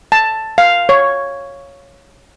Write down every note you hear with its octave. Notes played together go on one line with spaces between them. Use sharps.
A5
F5
C#5